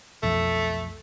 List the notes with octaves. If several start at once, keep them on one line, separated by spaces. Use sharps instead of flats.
B1 F2 A3